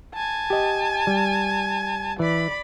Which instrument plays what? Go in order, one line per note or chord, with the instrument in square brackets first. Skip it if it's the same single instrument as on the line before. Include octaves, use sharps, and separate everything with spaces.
[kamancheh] G#5 A5
[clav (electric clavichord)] G4 D#5
G3
[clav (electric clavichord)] E3 [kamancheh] D5 B5